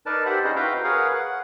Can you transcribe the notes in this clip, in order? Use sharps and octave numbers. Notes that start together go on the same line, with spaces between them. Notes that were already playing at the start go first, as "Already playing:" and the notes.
D#4 A#4 B4 D5 A5
G4 C5 D5 E5 F#5
C#4 D#4 E4 G#4 C5 D#5
F#4 B4 E5 F5 G5 A#5
G#4 A#4 B4 C#5 F5 F#5
F#5